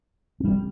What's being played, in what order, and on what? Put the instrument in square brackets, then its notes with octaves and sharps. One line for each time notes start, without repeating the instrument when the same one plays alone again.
[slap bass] G3 C4